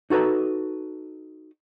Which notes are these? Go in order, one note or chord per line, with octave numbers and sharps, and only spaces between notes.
D#4 F#4 A4 B4 A#5